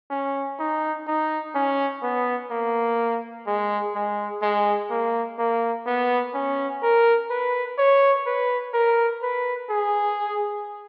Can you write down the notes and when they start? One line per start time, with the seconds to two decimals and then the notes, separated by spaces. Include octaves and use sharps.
0.11 C#4
0.59 D#4
1.07 D#4
1.55 C#4
2.03 B3
2.51 A#3
3.47 G#3
3.95 G#3
4.42 G#3
4.90 A#3
5.39 A#3
5.87 B3
6.34 C#4
6.83 A#4
7.30 B4
7.79 C#5
8.26 B4
8.74 A#4
9.22 B4
9.70 G#4